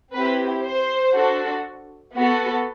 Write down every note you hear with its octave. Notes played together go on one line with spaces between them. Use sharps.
C4 E4 G4 B4
C5
D4 F#4 A4
B3 F#4 A4